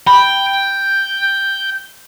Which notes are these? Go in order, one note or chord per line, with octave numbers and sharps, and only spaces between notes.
G5 B5